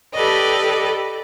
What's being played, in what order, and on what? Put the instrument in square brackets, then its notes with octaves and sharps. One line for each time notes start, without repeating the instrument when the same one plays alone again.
[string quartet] G4 A4 B4 D5 D#5